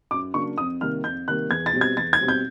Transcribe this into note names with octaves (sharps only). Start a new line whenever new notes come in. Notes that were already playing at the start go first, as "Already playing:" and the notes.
F#2 D6
C#3 F#3 A#3 D4 C#6
F2 D#6
C3 D#3 G3 A#3 F6
F2 G6
C3 D#3 G3 A#3 F#6
E2 G#6
A6
B2 G3 C4
G#6
E2 A6
G#6
B2 G3 C4
G6